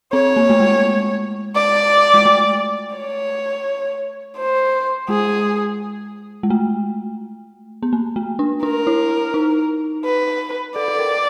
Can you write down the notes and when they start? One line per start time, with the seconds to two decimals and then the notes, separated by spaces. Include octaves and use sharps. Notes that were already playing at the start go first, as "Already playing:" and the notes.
0.13 C4 C#5
0.36 A#3
0.50 A3
0.60 G#3
1.55 D5
2.14 G#3
2.25 A3
2.96 C#5
4.37 C5
5.09 G#3 G#4
6.43 G#3
6.50 A3
7.83 B3
7.93 A#3
8.16 A3
8.39 D4
8.63 D4 A#4
8.87 E4
9.34 D#4
10.05 B4
10.76 A4 D5
10.88 A4
10.99 A#4